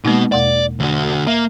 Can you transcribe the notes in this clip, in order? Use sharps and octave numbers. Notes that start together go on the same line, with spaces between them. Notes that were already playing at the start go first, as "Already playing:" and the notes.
B2 G#3 A#3 B3 D#4
E2 B2 D5 F#5
D2 F#4
A#3 E5